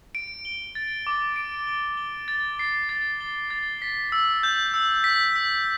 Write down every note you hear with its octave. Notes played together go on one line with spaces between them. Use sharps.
D7
G7
A6
D6
D7
G7
G7
A6
C7
A6
G7
A6
B6
E6
G6
E6
B6
E6